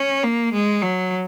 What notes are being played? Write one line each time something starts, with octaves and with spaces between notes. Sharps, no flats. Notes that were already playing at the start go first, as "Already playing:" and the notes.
Already playing: C#4
A#3
G#3
F#3